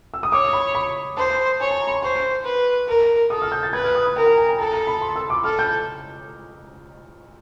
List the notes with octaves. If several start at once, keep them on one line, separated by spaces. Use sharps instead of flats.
E6
D#6
C#5 D6
B5
B5
C5 A5
C#5 G#5
A5
A#5
B5
C6
C5 C#6
B4
A#4
A4 D#6
F6
G6
A6
B4 G#6
F#6
F6
D#6
B5
A#4 G5
G5
G#5
A#5
A4 A5
A#5
B5
C6
E6
D6
A4 F6
G6